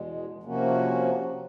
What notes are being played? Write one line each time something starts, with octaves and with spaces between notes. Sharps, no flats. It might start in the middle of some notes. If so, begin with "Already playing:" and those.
Already playing: E2 B2 G#3
C3 F3 A#3 C#4 F#4